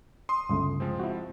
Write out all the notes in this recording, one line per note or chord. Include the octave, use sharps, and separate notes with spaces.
C6 D#6
G1 C#2 A3
F3 G#3 C4
E4 F#4